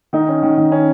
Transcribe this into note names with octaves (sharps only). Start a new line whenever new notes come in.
D#3 D#4
C#4
D#3
D#3
C#4